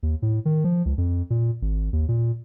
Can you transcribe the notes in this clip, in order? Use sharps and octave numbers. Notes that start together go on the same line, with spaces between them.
D#2
A2
D#3
F3
C#2
F2
A#2
G#1
D#2
A#2